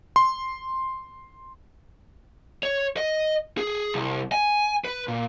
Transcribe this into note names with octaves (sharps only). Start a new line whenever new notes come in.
C6
C#5
D#5
G#4
C2
G#5
B4
A#2